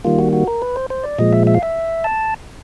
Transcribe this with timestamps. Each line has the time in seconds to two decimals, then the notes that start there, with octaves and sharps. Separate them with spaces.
0.05 D#3 G3 A#3 F4
0.19 F#4
0.33 F#4
0.47 A#4
0.62 B4
0.76 C5
0.90 C5
1.04 D5
1.19 A#2 F3 G#3 D#5
1.33 E5
1.47 E5
1.54 F5
1.63 E5
2.04 A5